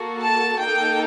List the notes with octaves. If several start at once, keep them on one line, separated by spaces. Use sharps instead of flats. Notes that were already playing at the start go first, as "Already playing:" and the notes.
Already playing: A#3 F#4 A4
A5
A#3 D#4 A4 G5